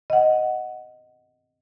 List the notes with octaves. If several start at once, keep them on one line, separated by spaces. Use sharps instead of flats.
D#5 F#5